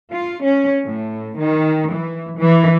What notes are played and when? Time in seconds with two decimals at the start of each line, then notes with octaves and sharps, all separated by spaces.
0.12 F4
0.44 C#4
0.85 A2
1.37 D#3
1.92 E3
2.38 E3